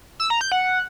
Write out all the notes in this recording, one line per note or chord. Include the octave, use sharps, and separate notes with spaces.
E6
A#5
G6
F#5